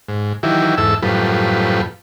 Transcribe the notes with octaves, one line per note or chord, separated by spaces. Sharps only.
G#2
D#3 E3 F#3 E4 G4
E2 G#2 A4 E5 E6
F#2 A2 F3 G3 B4